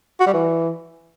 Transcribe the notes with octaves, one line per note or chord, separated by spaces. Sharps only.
F#4
G3
E3